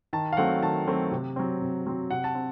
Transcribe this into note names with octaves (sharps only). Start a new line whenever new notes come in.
D#3 A5
F5
F#3 A3 C4 F#5
D#3 A5
F#3 A3 C4
C3
F#3 C4
C3
F#3 C4
C3 F#5
A5
C4